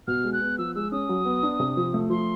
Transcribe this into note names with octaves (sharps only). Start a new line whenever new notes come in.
B2 F6
G#3
F#6
B3
F3 E6
G#3 E6
C#4 D#6
F#3
B3
D4
C3
F3
A3
F3 C6